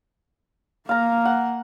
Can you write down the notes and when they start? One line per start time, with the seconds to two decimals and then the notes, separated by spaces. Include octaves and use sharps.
0.89 A#3 F5 A#5
1.25 F#5